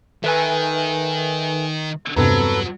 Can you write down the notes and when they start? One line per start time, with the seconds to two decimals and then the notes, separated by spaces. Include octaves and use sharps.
0.24 D#3 A4 B4 E5 G#5
2.16 E2 G2 C3 F#3 A4 B4 A#5